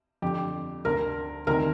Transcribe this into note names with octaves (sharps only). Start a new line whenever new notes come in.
F2 D3 G4
D2 D3 A#4
D2 C3 D#3 A#4